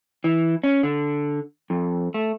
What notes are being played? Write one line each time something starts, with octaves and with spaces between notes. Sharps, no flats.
E3
C#4
D3
F2
A3